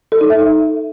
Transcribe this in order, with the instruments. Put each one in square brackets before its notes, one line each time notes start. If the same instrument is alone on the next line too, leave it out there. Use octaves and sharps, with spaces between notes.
[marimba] A4
D#4
E5